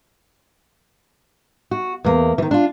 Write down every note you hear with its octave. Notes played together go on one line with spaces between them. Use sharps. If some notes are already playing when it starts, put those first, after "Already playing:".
F#4
E2 A#3
D#3 E3
D4 F4